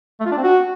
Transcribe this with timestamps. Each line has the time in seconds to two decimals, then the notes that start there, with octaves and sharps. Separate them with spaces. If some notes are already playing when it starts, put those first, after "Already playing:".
0.20 A3
0.26 F4
0.32 D4
0.37 C4
0.43 F#4